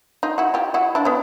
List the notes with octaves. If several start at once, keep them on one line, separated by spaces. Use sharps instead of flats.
D#4 F4
E4 F#4
F4 G4
E4 F#4
D4 E4
B3 C#4